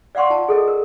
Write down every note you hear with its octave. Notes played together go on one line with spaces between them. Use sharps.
D5 F5 F#5 C6 C#6
F4 A5
G#4 A4 D#5
A#4